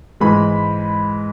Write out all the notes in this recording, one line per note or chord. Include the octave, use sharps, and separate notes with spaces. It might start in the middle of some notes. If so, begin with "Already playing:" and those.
G#2 E3 G#3 B5